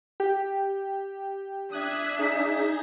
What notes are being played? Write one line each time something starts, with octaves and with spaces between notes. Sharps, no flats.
G4
D4 E5 D#6 F#6 G#6
D#4 G#4